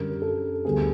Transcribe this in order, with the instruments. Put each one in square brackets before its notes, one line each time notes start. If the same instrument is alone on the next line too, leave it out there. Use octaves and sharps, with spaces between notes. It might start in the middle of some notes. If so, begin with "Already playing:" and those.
Already playing: [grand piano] F#2 D3 G3 A#4
A4
D2 D3 G3 B3 G#4